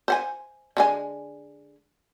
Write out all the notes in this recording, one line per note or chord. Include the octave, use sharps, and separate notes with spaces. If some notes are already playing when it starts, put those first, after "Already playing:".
C5 F#5 G#5
D3 G#3 G#5